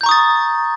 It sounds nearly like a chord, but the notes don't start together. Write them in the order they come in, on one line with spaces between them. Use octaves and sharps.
G6 A#5 C#6 D#6 A6